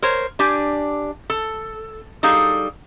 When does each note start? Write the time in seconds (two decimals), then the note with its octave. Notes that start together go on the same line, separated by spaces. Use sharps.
0.02 A#4 C5 C#5
0.39 D4 G4 G#5
1.30 A4
2.23 G3 D#4 G#4 A4 F5